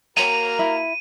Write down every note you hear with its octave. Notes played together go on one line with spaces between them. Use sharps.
A#3 F#4 A#4 C#5 G5 A#5 D#7
E4